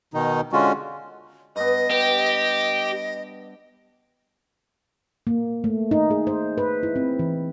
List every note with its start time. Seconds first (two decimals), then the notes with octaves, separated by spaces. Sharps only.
0.14 B2 D#3 D#4
0.53 D3 G#3 C#4 F4 F#4
1.56 G2 B3 D#5
1.90 G4
5.27 A#3
5.64 A3
5.91 D#4
6.11 G#4
6.27 C5
6.58 B4
6.83 E4
6.96 C4
7.19 E3